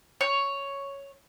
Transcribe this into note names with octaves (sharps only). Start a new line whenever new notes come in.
C#5